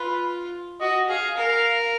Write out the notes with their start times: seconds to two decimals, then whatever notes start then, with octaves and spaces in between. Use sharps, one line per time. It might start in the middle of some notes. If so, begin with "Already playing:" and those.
Already playing: F4 B4
0.80 F#4 D#5
1.09 G#4 F5
1.37 A#4 F5